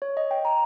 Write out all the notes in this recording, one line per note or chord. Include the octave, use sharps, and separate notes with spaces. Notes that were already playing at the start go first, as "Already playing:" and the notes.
C#5
D#5
G5
A#5